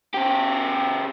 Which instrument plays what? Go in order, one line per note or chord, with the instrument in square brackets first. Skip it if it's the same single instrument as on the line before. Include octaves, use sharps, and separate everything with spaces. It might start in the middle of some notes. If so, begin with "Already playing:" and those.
[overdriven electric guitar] C#3 G4